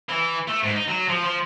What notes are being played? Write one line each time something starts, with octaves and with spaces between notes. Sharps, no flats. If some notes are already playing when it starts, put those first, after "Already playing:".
E3
A3
G#2
D#4
F#3
F3
F3